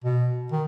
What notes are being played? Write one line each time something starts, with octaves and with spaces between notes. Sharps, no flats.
B2
D#3